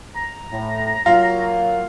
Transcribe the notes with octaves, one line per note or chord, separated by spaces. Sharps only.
A#5
A2
F#3 A#3 F4